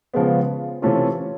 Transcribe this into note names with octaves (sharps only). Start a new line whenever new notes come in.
C#3 F3 G#3 B3
C3 E3 A3 C#4 F4